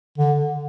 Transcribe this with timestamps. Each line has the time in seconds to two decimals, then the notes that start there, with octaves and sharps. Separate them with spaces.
0.18 D3